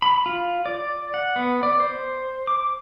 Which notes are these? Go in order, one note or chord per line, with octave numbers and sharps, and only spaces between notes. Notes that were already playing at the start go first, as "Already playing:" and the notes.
B5
F4
D5
F#5
B3
D5
C5
D6